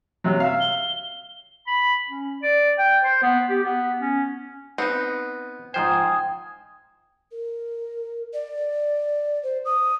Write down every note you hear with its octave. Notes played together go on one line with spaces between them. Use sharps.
C3 F#3
E5 F5
G7
B5
C#4
D5
G5
C5
B3
G4
B3
C#4
B3 C4 D#4
G#2 F3 C5 G5 G#5 D#6
A#4
D5
C5
D#6